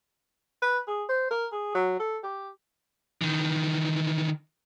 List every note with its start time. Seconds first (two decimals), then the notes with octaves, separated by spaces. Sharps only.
0.62 B4
0.87 G#4
1.09 C5
1.30 A#4
1.52 G#4
1.75 F#3
1.99 A4
2.23 G4
3.22 D#3 E3